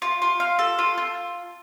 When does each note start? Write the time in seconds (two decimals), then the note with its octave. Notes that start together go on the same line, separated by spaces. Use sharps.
0.02 F4
0.22 F4
0.40 F5
0.59 A4
0.78 F4
0.98 F4